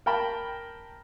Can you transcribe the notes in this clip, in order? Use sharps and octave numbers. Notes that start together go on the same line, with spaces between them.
A#4 G5 A5 B5